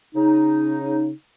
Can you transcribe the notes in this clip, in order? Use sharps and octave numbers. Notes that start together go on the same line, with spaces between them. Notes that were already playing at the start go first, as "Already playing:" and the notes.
C#3 D#4